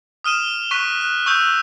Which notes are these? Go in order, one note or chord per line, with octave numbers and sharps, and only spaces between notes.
D#6 F6 D#7 E7 G7
C#6 F#6 B6 D#7
F#6
C#6 E6 G6 F7